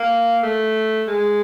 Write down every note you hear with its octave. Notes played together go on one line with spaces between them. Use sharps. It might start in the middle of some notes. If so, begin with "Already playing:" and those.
Already playing: A#3
A3
G#3